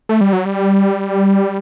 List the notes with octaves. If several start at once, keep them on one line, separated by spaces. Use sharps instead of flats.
A3
G3
F#3
G3